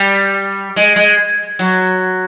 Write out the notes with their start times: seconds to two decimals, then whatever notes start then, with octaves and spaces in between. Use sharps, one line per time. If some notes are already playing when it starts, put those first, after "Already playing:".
Already playing: G3
0.76 G#3
0.96 G#3
1.59 F#3